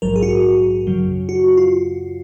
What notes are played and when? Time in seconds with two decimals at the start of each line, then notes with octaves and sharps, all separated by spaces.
0.02 A#1 G#2 F#3 A#4
0.16 G#4
0.23 F#4
0.87 F#2 C#3 F#3
1.29 F#4
1.57 F4